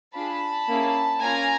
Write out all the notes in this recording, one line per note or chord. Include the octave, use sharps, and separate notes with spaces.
D4 F4 G#4 A5 B5
A#3 C#4 E4 G#4
A#3 C#4 F4 G#5 A#5